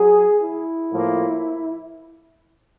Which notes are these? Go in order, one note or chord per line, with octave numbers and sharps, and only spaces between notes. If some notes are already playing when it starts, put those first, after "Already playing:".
Already playing: F#3 G#4
E4
A2 F3 A#3